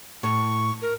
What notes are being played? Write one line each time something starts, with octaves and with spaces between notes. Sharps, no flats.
A2 C#6
A#4